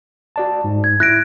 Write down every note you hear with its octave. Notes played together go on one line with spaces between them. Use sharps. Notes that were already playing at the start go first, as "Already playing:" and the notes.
F#4 D5 A5
G#2
G#6
E4 F#6 A#6 D7